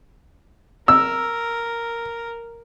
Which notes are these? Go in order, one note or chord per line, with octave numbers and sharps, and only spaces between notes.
A#4 E6